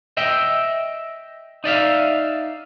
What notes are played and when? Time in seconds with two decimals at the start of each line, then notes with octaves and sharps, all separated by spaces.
0.17 D#5 E5 G5
1.64 D#4 D5 E5 F5